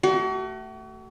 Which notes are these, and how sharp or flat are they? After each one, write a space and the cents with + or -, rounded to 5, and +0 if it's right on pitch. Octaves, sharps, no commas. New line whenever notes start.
A3 +10 F#4 +40